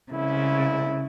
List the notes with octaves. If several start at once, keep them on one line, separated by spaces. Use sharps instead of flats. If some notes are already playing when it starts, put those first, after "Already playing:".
C2 C#3 G#3 E4